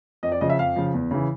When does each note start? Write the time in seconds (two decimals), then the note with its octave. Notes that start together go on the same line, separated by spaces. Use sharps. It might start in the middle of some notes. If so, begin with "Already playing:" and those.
0.23 F2 D#5
0.32 D5
0.41 C#3 F3 D#5
0.50 E5
0.59 F2 F5
0.76 C#3 F3
0.94 E2
1.11 C#3 E3